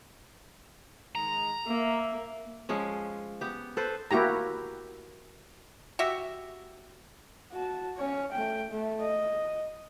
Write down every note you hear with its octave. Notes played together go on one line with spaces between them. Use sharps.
D#3 G#3 A#5
A#3 E5
F3 G#3 C#4
B3 G4
A4 B4 C5
A#3 E4 F#4 G4 A#5
F#4 G4 E5
F#4 A5
C#4 C#5
A3 G5
A3
D#5